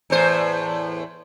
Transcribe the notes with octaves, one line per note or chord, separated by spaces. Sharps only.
E2 A2 C5